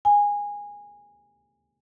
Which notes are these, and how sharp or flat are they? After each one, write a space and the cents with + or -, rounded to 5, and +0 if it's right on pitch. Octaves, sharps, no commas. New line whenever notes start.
G#5 -15